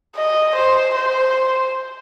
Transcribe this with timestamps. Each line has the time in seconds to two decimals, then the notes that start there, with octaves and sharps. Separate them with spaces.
0.16 D#5
0.56 C5
0.96 C5